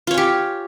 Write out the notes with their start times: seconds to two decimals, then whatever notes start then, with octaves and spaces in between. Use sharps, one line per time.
0.07 F4
0.11 C#5
0.14 G#5
0.18 G4